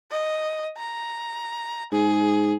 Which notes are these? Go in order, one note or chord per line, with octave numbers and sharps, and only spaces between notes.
D#5
A#5
G#2 G#4